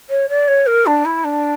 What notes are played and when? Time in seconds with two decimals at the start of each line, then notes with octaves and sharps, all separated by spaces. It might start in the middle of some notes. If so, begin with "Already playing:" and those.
0.09 C#5
0.29 D5
0.48 C#5
0.66 A#4
0.86 D4
1.05 E4
1.24 D4